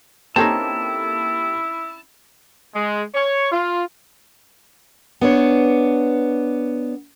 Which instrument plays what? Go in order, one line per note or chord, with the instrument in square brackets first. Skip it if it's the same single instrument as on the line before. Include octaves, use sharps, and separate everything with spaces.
[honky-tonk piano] A#3 G4 A4 [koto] C4 C#4 D#4 [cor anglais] E4 [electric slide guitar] A5
[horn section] G#3
C#5
F4
[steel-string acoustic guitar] B3 D4 C#5